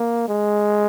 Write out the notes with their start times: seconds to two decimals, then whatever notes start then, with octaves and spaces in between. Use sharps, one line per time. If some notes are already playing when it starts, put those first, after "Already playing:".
Already playing: A#3
0.28 G#3